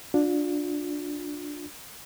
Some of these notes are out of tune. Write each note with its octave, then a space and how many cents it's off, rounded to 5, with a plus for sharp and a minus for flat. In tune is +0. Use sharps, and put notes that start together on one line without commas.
D4 +0 F4 +35